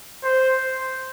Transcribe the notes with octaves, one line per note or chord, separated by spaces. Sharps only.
C5